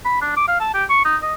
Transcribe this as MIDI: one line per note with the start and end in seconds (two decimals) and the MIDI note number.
0.05 0.20 83
0.21 0.33 62
0.37 0.46 86
0.48 0.59 77
0.60 0.74 81
0.74 0.84 67
0.90 1.03 85
1.05 1.16 63
1.22 1.34 75